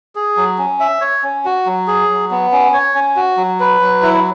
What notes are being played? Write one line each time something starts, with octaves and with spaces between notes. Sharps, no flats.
G#4
F#3
C#4
E5
C#5
C#4
F#4
F#3
G#4
F#3
B3
C#4
C#5
C#4
F#4
F#3
B4
F#3
E4